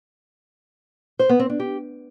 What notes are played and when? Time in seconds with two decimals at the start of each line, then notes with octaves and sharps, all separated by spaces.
1.19 C5
1.29 B3
1.40 C4
1.50 D4
1.60 G4